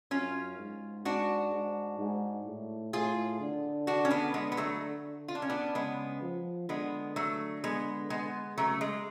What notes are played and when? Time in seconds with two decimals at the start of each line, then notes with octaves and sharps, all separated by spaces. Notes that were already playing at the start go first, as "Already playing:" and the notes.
0.11 F#2 C#4 F4
0.58 G#2
1.05 G#2 D4 F#4
1.52 G#2
1.99 G#2
2.46 A2
2.93 A2 F4 G#4
3.40 D3
3.87 D4 F#4
4.05 C#4
4.11 B3 D4
4.34 G#3 B3
4.52 B3
4.57 F#3 A3
5.28 F4
5.35 D4
5.42 C#4
5.50 B3 D4
5.75 C#3 G#3 B3
6.22 F3
6.69 D3 G#3 B3
7.16 F#3 A3
7.64 G#3 B3
8.10 G#3 B3
8.57 C#3 F#3 A3
8.81 G#3